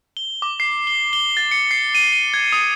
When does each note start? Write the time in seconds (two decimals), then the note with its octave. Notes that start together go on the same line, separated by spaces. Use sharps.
0.17 G7
0.42 D6
0.60 C7
0.87 G7
1.13 G7
1.37 A6
1.51 C#7
1.71 C7
1.95 D#7
2.12 D#7
2.34 G#6
2.52 D#6